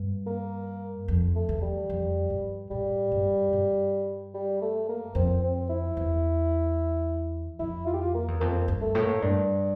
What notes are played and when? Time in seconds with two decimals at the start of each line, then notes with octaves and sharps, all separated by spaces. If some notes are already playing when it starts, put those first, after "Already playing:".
Already playing: G2
0.26 A#3
1.08 F2
1.35 A3
1.49 E2
1.62 G3
1.89 F2
2.30 G2
2.70 A2 G3
3.12 G2
3.53 G2
4.34 G3
4.61 A3
4.88 A#3
5.15 F2 C4
5.43 C4
5.69 E4
5.97 E2
7.59 F2 E4
7.86 F4
7.93 G4
8.01 F4
8.14 A#3
8.28 E2
8.40 F2 A#3
8.68 G2
8.81 A3
8.95 A2
9.02 A#3
9.22 G2 D4